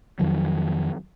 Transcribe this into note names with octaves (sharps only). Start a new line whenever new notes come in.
F2 D#3 F#3